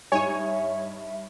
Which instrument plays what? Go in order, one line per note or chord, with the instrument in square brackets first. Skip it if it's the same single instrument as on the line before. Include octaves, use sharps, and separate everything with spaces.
[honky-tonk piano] G2 D#4 D#7 [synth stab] C#5 [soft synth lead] E5 [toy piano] G#5